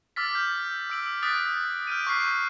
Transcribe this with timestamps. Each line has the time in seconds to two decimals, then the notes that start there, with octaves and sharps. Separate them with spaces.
0.16 D6 E6 F6 A6 B6
0.35 G6
0.90 E6 D7 F#7
1.23 D#6 F#6 A6 B6 D7
1.87 F6 G6 D7 D#7
2.07 C#6 F#6 B6 C7